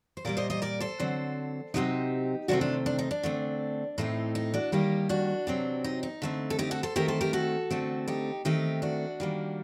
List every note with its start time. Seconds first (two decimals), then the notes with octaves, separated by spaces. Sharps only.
0.17 C5
0.25 A#2 G3 A#3 A#4 D5
0.37 C5 D#5
0.50 C5 D#5
0.62 A#4 D5
0.80 A4 C5
1.00 D3 F#3 C4
1.74 C3 F#3 A3 C4 D#4 G4
2.48 C3 D#3 A3 C4 D4 F#4
2.61 D4
2.86 D4
2.99 D#4
3.11 D4
3.23 D3 A3 C4
3.98 A2 A3 C4 D#4
4.35 D#4
4.54 D4 F#4
4.72 D#3 G3 A#3 D#4 G4
5.09 D4 F#4
5.47 C3 F#3 C4
5.84 D#4
6.03 D#4
6.22 D3 A3 C4
6.50 A4
6.59 D#4 G4
6.71 F#4 A4
6.83 A4 C5
6.96 D#3 A3 C4 G4 A#4
7.08 A4 C5
7.21 G4 A#4
7.33 F#4 A4
7.70 D3 A3 C4
8.08 D#4 G4
8.45 D#3 A3 C4 D#4 G4
8.82 D4 F#4
9.20 D#3 G3 A#3